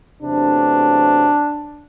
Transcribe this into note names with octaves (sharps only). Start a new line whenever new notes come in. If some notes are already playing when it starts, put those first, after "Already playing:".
E2 C3 F#3 A3 D4